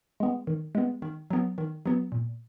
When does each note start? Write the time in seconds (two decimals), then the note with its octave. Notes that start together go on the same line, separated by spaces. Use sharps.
0.20 G#3 B3
0.47 D#3
0.75 G#3 B3
1.02 D#3
1.30 F#3 B3
1.58 D#3
1.86 F#3 B3
2.12 A#2